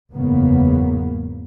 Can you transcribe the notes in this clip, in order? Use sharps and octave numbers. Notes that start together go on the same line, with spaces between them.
F#1 E2 G#2 C#3 A#3 B3